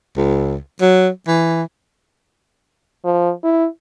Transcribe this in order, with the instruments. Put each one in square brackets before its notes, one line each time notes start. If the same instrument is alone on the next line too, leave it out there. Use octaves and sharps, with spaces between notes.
[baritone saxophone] C#2
F#3
E3
[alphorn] F3
E4